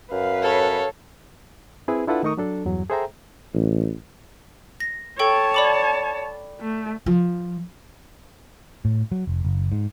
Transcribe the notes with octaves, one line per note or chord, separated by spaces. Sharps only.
F#2 B4 F5
A4 C#5
C4 E4 G#4 B4
D4 E4 F4 A4 B4 F#5
D#3 A3 D#4 A#4 C#6 D#6
F#3 D4 A4
E2 G2 F#3
G#4 A4 C5 E5 G5 A#5
A1
A#6
A4 C#5 G5 A5 C#6
D5 B5 D6
A3
F3
A2
F#3
F1
F#1
G#2